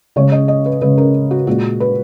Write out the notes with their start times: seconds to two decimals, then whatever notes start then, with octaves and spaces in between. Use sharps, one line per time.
0.16 C#3 G#3 C#5
0.32 D#5
0.48 D#5
0.66 B4
0.81 C#3 G#3 B4
0.98 A#4
1.31 F#4
1.47 A#2 G#3 F#4
1.80 B4